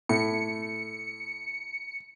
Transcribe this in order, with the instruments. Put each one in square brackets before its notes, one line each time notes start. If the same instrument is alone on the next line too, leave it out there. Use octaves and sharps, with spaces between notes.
[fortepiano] A2 [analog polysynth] C#7